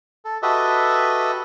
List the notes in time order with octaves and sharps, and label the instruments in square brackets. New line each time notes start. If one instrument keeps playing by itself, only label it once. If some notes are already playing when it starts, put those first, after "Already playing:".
[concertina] A4
F#4 G4 A4 B4 D#5 E5